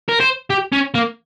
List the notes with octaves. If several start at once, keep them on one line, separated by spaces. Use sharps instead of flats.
A#4
C5
G4
C#4
A#3